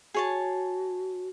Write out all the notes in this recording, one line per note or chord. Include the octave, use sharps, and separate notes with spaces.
F#4 G#4 C#5 A5